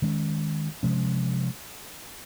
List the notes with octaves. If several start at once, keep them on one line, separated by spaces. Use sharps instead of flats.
D#3 G#3 C#4
C3 F3 G#3 C#4